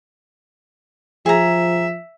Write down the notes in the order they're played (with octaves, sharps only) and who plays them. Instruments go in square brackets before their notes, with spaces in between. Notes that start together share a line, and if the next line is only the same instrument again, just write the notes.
[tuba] F3 [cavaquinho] G#4 A#5 [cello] E5